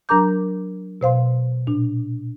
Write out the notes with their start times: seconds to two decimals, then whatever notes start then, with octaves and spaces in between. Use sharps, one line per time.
0.09 F#3 D4 A#4 A#5 D6 G6
1.01 B2 C5 F5 C6
1.67 A#2 D4